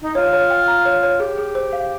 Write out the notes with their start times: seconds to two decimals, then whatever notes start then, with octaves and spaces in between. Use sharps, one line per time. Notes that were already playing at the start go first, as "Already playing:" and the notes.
0.02 D#4
0.15 F4 C#5
0.33 C#5
0.51 G5
0.68 A#5
0.85 C#5
1.03 C#5
1.20 G4 G#4
1.38 G#4
1.55 C5
1.73 F5